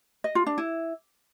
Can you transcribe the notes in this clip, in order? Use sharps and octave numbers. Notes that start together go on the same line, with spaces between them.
D#5
F4
D4
E4